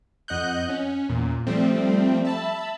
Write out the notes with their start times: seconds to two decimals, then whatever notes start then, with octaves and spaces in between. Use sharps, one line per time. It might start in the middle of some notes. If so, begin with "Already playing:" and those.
0.28 F2 D#5 F#5 F#6 G6
0.69 C#4
1.09 E2 A#2
1.47 F3 G3 A3 C4
2.25 E5 A5 B5